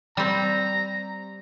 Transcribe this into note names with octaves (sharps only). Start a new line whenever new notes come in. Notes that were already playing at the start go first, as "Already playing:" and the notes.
G3 C4 A#5